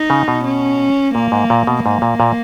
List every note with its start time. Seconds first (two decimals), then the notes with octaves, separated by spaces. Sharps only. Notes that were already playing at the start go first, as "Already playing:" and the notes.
Already playing: D#4
0.10 C#3
0.28 B2
0.45 C#4
1.15 A#2 A#3
1.32 G#2
1.50 A#2
1.67 B2
1.84 G#2 A#3
2.02 A#2
2.20 A#2